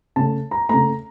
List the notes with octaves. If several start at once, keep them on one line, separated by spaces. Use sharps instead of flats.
C#3 A3 A5
A#5
C#3 A3 A#5